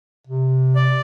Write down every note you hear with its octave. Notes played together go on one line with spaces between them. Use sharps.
C3
D5